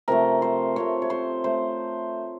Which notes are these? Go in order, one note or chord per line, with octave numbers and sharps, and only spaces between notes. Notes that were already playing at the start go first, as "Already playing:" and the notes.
C3 F3 A3 A#4
C5
C3 F3 A3 C#5
C#5
C5
A3 C5